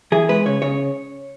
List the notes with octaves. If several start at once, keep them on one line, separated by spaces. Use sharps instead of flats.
E3 G#4
G#3 B4
C#3 C#5
C#3 C#5